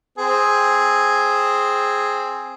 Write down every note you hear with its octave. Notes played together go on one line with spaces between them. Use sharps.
C4 G#4